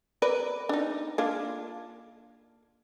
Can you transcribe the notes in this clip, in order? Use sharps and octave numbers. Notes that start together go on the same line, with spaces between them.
A#4 B4 D5
D4 D#4
A#3 D4 F4